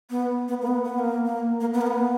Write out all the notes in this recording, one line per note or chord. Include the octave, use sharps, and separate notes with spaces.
B3
B3
A#3
B3
B3
A#3
A#3
A#3
B3
A#3
B3